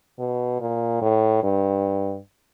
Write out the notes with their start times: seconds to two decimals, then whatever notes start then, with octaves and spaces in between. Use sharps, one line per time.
0.19 B2
0.60 A#2
1.02 A2
1.43 G2